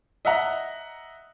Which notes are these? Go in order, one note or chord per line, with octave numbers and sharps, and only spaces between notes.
D#5 E5 F#5 A#5